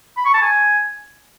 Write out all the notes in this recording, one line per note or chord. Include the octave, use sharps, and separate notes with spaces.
B5
C#6
A5
G#5